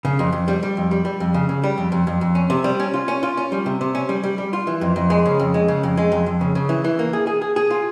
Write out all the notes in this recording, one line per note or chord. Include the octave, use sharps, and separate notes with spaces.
C#3
F2
F2
G3
G3
F2
G3
G3
F2
C#3
C#3
G3
F2
F2
F2
F2
C#4
C3
G3
C#4
F4
C#4
F4
C#4
G3
C3
C3
C#4
G3
G3
G3
F4
E3
F2
F2
G#3
C#3
F2
G#3
C#3
F2
G#3
F2
F2
C#3
C#3
E3
E3
A#3
G#4
G#4
G#4
G#4
F4